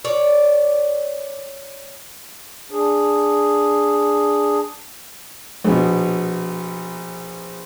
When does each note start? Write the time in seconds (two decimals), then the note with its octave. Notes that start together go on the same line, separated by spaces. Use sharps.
0.05 C#5 D5
2.71 D4 G#4
5.64 A#1 B2